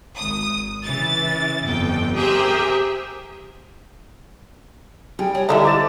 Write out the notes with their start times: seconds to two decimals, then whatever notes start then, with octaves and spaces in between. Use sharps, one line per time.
0.17 G#1 D#6
0.83 C#3 E3 A6
1.63 G1 F2 G5
2.14 G4 G#4 A#4 C5 E5
5.19 G3 G#4 G5
5.35 G#4 C#5
5.49 D3 F3 D#4 E4 A4 E5 A#5
5.65 C5 D6 A6 E7